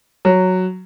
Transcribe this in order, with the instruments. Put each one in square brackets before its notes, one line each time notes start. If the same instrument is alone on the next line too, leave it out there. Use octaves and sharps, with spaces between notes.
[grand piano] F#3